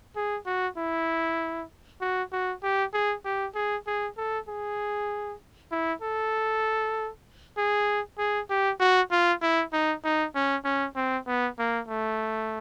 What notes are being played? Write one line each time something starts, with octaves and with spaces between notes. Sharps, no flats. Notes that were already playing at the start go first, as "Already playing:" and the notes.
G#4
F#4
E4
F#4
F#4
G4
G#4
G4
G#4
G#4
A4
G#4
E4
A4
G#4
G#4
G4
F#4
F4
E4
D#4
D#4
C#4
C#4
C4
B3
A#3
A3